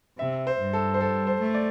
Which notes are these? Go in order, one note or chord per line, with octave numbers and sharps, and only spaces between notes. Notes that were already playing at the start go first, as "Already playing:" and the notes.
C3 E5
C5
G2
A4
C5
G3 A4
C5
A3
D5